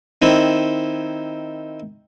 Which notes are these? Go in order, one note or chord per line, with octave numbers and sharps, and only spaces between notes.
D#3 C4 E4